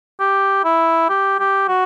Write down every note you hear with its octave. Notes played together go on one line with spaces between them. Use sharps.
G4
E4
G4
G4
F#4